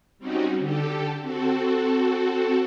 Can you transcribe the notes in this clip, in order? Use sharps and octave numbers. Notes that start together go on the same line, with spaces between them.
G3 C4 C#4 D#4 F#4
D3 G4 A4
C4 F#4 A4